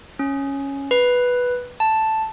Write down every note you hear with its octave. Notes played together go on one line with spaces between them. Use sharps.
C#4
B4
A5